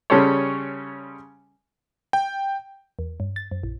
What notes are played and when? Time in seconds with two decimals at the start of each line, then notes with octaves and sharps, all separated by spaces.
0.10 C#3 G3 C#4 A4 C5 C#5
2.13 G5
2.99 E2
3.20 G2
3.36 A6
3.51 F#2
3.63 A#1